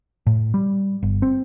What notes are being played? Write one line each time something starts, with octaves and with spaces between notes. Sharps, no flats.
A2
G3
G1
C4